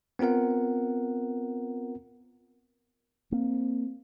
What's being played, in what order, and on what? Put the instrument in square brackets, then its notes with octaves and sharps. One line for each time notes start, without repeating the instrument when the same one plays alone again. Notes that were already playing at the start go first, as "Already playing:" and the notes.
[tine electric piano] B3 C4 F4 A#4 F#5
[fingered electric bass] A#3 [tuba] C4